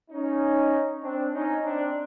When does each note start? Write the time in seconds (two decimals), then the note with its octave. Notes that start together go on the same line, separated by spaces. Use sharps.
0.11 C#4 D#4
1.03 C4 D4
1.34 C#4 D#4
1.64 C4 D4